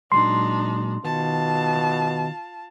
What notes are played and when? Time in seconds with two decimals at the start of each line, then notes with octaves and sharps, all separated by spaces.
0.12 A#2 F#3 G#3 D4 D#4 C6
1.04 B2 D#3 F4 A5